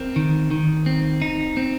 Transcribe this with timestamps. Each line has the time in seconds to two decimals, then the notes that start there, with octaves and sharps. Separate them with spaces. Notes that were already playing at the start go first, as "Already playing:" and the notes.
Already playing: C4 A#4
0.16 D#3
0.51 D#3
0.86 C4
1.22 D#4
1.57 C4